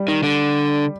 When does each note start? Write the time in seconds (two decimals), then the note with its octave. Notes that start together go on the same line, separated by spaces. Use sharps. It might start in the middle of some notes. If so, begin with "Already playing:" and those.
Already playing: G3
0.08 D#3
0.23 D3